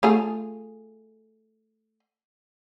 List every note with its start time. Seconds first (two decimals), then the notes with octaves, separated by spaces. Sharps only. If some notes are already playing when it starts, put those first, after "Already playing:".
0.03 A3 F4 G#4